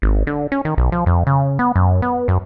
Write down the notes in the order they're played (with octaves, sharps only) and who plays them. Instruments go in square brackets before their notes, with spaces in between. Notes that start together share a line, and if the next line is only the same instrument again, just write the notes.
[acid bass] G#1
D3
C#4
D#3
B1
F3
F2
C#3
B3
F#2
B3
F#2